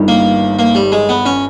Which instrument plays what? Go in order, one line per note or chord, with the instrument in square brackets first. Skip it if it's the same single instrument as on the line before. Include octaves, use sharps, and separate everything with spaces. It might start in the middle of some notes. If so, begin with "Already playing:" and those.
Already playing: [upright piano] G1 G2 D#3
[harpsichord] A#3
A#3
G3
G#3
B3
C#4